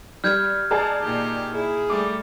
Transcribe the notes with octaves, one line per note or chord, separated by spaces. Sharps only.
G3 F6 G6 G#6
G#3 G#4 D5 A5 A#5
A#2 D#3 G4
E4 G#4
G3 A3 D6